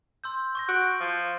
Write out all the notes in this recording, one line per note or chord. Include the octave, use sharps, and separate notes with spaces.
C6 E6 G6
C#6 G6 A#6
F#4 D7
F3